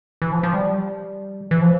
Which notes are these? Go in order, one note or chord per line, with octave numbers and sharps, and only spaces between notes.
E3
F3
F3
G3
E3
F3